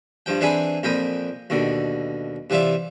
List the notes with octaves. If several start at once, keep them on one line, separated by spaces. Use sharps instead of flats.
G2 F3 G5
E3 C4 D4 G#4 G#5 B5
F2 A#2 G5 B5 D#6
D#2 B2 D3
C3 E3 F4 D5 E5